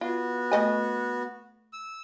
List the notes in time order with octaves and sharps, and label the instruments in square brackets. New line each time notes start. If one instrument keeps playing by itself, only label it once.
[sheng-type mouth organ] B3 F#4 [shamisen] F4
[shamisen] A3 D#5 G#5
[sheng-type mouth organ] E6